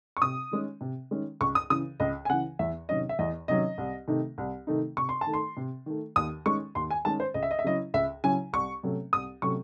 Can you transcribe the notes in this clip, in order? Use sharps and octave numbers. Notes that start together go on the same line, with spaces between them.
C#6
C3 D#6
D#3 G#3 C#4
C3
D#3 G#3 C#4
C#2 C#6
D#6
C#3 E3 D#6
C#2 D#5
G#5
C#3 E3 F#5
E2 E5
C3 D#3 F#3 C#4 D#5
E5
E2 D#5
C3 D#3 F#3 C#4 D#5
C2
C3 D#3 A3 D#4
C2
C3 D#3 A3 D#4
C3 C#6
C6
A5
D#3 A3
C6
C3
D#3 A3
D#2 D#6
D#3 G#3 C#4 C#6
D#2 C6
G#5
D#3 G#3 C#4 A5
C5
C#2 D#5
E5
D#5
E5
C#3 F#3 C#4 E4 D#5
C#2 E5
C#3 F#3 C#4 E4 G#5
C2 C#6
C3 F#3 A3 C#4
C2 D#6
C3 F#3 A3 C#4 C#6